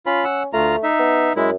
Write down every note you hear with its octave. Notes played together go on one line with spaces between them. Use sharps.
C#4 F4 B5
F#5 E6
D2 A3 F4 A#5
D#4 E5
B3
F#2 G#3 E4